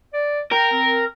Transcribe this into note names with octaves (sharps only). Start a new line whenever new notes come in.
D5
A#4 G5
C4